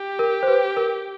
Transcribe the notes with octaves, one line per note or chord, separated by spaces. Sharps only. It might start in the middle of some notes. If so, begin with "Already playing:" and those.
Already playing: G4
A#4
C5
B4
A#4